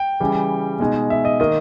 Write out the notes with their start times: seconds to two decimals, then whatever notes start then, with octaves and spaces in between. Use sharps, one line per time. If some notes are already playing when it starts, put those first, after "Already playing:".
Already playing: G5
0.20 C#3 E3 G3
0.80 B2 G#3 D#4
1.10 E5
1.25 D#5
1.40 D#3 A#3 D#5